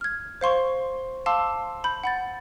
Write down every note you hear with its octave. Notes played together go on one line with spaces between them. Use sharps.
F6 G#6
C5 F5 C6 C#6
F5 A5 C6 D6 E6
B5 G6
F#5 B5 A6